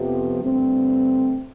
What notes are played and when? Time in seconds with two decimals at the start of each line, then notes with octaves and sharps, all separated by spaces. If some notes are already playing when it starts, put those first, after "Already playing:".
Already playing: F2 C3 F3 B3 G4
0.41 G2 D3 A3 C4